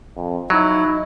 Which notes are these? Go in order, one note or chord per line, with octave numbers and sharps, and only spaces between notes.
F2
F#3 D#4 E4